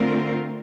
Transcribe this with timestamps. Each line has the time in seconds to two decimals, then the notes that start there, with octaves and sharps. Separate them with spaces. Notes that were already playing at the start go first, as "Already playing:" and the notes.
Already playing: D3 A3 C4 F4 A#4